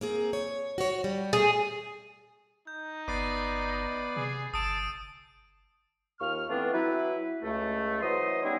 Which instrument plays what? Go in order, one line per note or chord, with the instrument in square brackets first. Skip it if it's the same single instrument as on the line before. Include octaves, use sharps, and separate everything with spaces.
[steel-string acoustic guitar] A#3 C4 G#4
C#5
F#4 C#5
G3
[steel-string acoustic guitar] A3 G4 [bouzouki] G#4
[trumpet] D#4 [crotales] G6
[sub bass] G1 [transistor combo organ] B3 D5 [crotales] A6 C7 D#7
[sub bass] C3 [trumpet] G#4
[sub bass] G1 [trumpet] A5 [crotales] D#6 E6 D7
[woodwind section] D#2 F4 C#6 F6
E3 A3 B3 C4 D4 F4
F#3 E4 B4
C#2 A3
E3 F#3 C5 D#5 C6 D#6
G3 B3 C#4 D#4 E4 G#4